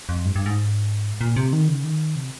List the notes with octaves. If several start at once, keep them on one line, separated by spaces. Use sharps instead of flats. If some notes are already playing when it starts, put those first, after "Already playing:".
F2
G2
G2
G#2
A#2
C3
D#3
C#3
D#3
C3